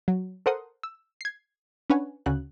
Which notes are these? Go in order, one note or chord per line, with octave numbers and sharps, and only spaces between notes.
F#3
A4 A#4 C5 F#5 C6 D#6
E6
G#6 C7
C#4 D4 B4 C#5 F#5 G#5
D2 C#3 F#4 F#6